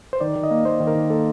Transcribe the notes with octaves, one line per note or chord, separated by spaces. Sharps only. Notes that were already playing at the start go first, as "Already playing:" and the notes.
C5
D#3 D5
D#3
D#5
A#3
A#3 C5
D#3
A#4
D#3
A#3 A4